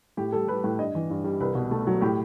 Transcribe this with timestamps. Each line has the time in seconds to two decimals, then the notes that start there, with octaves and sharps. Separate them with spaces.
0.17 A2 G4
0.32 G3 A4
0.48 G3 B4
0.64 A2
0.79 G2 D#5
0.95 E3
1.10 G2
1.24 G3
1.40 C2 B4
1.55 B2
1.71 A3
1.87 F#3
2.01 A2 G4